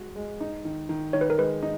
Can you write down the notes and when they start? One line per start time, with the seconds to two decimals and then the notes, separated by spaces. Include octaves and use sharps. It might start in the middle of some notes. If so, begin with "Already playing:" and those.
Already playing: G#3 F#4
0.16 G#3
0.40 D#4
0.65 D#3
0.89 D#3
1.13 D#3 C#5
1.21 B4
1.30 A#4
1.38 G#3 B4
1.62 D#4